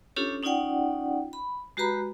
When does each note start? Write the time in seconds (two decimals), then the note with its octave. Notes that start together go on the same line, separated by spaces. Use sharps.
0.16 C#4 D4 F4 G4 A4 C#5
0.43 C#4 D#4 F4 D5 F#5 G5
1.33 B5
1.77 G#3 F#4 G4 B4 A#5 B5